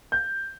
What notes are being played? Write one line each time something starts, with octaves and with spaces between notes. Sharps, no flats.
G6